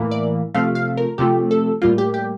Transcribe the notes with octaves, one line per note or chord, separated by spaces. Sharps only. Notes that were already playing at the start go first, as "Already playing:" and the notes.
Already playing: A2 E3 A#3
D5
C3 F3 A3 F5
F5
A#4
C3 F3 A3 G4
A4
A2 G3 A#3 F4
G4
G4